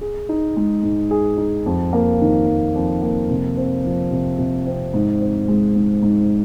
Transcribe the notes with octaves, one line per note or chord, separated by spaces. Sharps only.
G#4
D#4
G#3
G#2
G#4
D#4
F2
A#3
D#3
F2
F2
A#3
C3
C4
F3
C3
C3
C4
G#2
C4
G#3
G#2
G#2